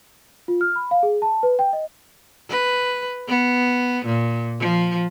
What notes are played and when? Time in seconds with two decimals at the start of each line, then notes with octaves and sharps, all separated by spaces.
0.48 F4
0.61 F6
0.76 B5
0.91 F5
1.03 G#4
1.22 A5
1.43 B4
1.59 G5
1.73 D#5
2.50 B4
3.28 B3
4.05 A#2
4.59 F3